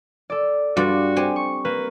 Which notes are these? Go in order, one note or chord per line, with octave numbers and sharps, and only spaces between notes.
A4 D5
G2 G3 F4 F#4 D5
C4 G4 G#5
C#6
A#3 B4